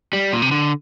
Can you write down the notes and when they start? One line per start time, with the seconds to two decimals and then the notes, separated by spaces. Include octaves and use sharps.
0.13 G3
0.33 A#2
0.42 C3
0.51 D3